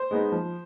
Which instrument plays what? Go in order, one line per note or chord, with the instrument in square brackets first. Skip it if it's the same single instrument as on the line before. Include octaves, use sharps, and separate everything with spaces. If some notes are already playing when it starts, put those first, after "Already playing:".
Already playing: [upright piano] C5
G#3 B3 D#4
F3